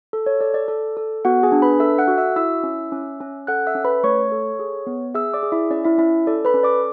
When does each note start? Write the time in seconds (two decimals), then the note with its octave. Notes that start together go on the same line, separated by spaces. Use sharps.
0.13 A4
0.26 C#5
0.41 A4 D5
0.54 D5
0.68 A4
0.97 A4
1.25 B3 F#4 F#5
1.43 G#4 G#5
1.52 D4
1.62 B4 B5
1.80 A4 E5 E6
1.98 F#5 F#6
2.08 F#4
2.18 E5 E6
2.36 E4 E5 E6
2.63 C#4
2.92 C#4
3.20 C#4
3.47 A4 F#5 F#6
3.67 E5 E6
3.75 C#4
3.84 B4 B5
4.04 A3 C#5 C#6
4.32 A4
4.59 G#4
4.87 B3
5.15 G#4 E5 E6
5.34 D5 D6
5.43 G#4
5.52 E4 E5
5.70 C#4 D5
5.85 E4 E5
5.98 C#4 E4 E5
6.27 A4 D5
6.45 B4 B5
6.54 C#4
6.63 D5 D6